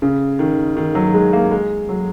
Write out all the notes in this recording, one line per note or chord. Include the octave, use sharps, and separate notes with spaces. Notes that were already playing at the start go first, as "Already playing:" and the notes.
C#3
D#3
D#3
F#3
G#3
A#3
G#3
F#3